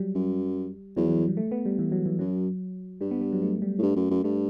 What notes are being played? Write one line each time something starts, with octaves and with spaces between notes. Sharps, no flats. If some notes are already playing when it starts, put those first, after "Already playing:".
Already playing: F#3 G3
F#2
E2 F#3
E3
F#3
G3
A3
B3
G3
E3
F#3
E3
F#2 F#3
G2 G3
B3
B3
F#3
A3
G3
A2
G2 A3
F#2
F#2
G2 A3